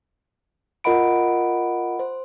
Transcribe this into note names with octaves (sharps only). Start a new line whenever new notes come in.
F4 A#4 D#5 F#5 B5 D7
C5